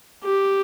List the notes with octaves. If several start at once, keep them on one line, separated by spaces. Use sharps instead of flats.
G4